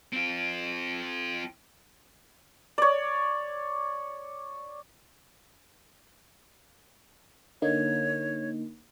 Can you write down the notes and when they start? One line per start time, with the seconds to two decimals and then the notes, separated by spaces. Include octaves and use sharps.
0.13 C4 F4
2.78 C#5 D5
7.62 D3 A#3 D#4 C#5